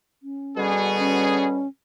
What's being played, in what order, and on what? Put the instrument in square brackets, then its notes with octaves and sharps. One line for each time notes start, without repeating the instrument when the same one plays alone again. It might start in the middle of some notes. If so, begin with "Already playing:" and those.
[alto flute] C#4
[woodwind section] B2 D3 G3 [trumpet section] B3 F#4 G#4
[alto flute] C#4